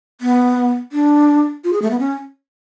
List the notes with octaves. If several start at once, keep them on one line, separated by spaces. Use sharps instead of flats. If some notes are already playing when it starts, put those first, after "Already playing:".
B3
D4
F4
G#4
A3
B3
C#4